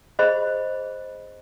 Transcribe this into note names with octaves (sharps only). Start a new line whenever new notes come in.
G#4 C5 D#5 B5